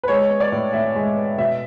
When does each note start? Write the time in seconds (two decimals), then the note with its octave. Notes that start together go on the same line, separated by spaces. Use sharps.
0.03 B4
0.08 G#3 C#5
0.29 B3
0.40 D5
0.52 A2
0.73 A2 E5
0.96 G#3
1.16 B3
1.38 B2 E5